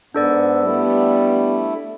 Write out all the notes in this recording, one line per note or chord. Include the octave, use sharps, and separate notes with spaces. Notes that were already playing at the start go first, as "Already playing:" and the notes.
G#2 B3 D4 A4 D5
G3 A3 B3 E4